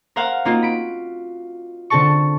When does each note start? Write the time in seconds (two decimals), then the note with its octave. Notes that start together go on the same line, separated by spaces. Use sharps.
0.16 A#4 C5 F5 F#5 F6
0.45 A#3 C4 D#4 F4 F#4
0.62 B5 D7
1.90 D3 C4 A4 A5 C#6